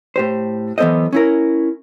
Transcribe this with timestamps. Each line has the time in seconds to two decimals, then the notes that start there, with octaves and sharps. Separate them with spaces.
0.16 A2 G4 C5
0.78 E3 F#3 B3 A4 C5 D#5
1.13 C#4 E4 A#4